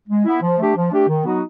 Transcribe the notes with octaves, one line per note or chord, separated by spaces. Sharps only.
G#3
B3 E4
F3
A3 D4 G4
F3
A3 D4 G4
D#3
F#3 B3 D#4 F#4